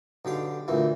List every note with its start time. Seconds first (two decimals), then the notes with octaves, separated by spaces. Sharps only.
0.25 B1 D3 G4 F5
0.68 D2 G2 A#2 E3